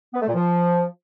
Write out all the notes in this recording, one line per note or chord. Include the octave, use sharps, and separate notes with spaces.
B3
A3
A#2
F3